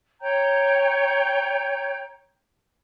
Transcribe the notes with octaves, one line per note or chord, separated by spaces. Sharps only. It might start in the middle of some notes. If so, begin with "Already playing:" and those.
C#5 G5 A#5 G6